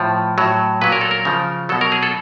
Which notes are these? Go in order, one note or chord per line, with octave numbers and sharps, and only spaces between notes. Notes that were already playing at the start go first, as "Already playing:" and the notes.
Already playing: A2 F3
A2 F#3
A#2 F#3 B4
A#4
A4
A#4
C#3 F3
B2 F#3 A4
A#4
G#4
A4